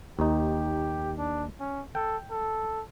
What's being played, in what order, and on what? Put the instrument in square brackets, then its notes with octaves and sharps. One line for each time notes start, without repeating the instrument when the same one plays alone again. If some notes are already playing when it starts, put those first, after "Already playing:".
[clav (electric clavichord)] D#2 D#4 [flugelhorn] G4
[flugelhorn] D4
C#4
[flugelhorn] A4 [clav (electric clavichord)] G5
[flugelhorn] A4